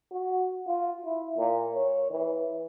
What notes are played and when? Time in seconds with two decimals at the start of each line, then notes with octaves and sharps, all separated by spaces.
0.11 F#4
0.67 F4
1.05 E4
1.37 A#2
1.75 C#5
2.10 E3